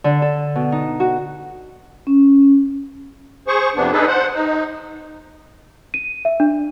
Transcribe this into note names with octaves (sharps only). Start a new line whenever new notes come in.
D3
A4
B2
D#4
F#4
C#4
G#4 C5 C#6
F2 C3 B3 D4
D4 D#4 G#4 A4 B4
C5 F#5
D#4
D#7
E5
D4